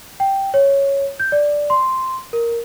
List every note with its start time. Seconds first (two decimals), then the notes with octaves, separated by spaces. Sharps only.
0.20 G5
0.54 C#5
1.20 G6
1.32 D5
1.70 C6
2.33 A#4